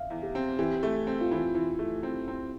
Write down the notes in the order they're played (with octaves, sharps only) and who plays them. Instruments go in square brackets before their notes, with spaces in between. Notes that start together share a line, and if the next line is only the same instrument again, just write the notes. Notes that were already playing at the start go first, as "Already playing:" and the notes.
Already playing: [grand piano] E5 F5
[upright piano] E2
[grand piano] G4
[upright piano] C4
[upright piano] E3 [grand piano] G4
[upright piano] A3
C4
[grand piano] F4
[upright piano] E3 [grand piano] E4
[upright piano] E3
A3
C4
C4